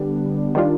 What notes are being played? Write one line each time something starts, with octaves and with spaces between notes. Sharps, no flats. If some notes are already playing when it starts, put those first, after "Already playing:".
Already playing: D3 G3 B3 D4
D#3 G3 D4 F4